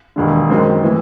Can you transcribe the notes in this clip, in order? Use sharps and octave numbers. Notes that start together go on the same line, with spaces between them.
E1 D#2 D3
F#2 D#3 G#3 C4
A2 E3